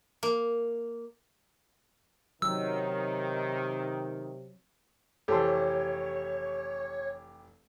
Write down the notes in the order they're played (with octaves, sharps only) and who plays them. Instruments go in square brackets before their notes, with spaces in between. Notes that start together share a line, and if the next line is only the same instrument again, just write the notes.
[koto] A#3
[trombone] C3 [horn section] D#3 [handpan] F#3 [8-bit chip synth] E6
[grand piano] F1 E3 [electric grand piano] G4 [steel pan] A4 C5 C6 [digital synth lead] C#5